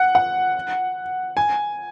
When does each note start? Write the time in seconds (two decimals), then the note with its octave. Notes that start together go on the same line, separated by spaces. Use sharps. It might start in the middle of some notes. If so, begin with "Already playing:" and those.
Already playing: F#5
0.15 F#5
1.37 G#5